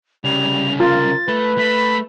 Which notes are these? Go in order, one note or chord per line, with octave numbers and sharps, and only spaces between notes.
C2 C#3 G3 F7
F4 A#4 A6
A3 B4
A3 B5